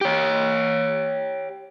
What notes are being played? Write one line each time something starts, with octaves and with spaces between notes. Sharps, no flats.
G4 C#5